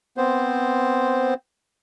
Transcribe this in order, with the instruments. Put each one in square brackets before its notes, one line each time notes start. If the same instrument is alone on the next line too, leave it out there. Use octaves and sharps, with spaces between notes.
[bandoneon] B3 C4 C5